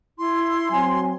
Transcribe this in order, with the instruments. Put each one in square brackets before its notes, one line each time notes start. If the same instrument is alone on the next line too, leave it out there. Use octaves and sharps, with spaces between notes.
[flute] E4 [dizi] C6
[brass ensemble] F#3 C4 [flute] G#5